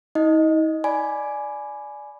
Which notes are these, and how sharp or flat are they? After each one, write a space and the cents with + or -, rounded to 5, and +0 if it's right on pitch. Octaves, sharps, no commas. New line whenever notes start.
D#4 +45 D#5 +0
D5 +0 G#5 +15 B5 +0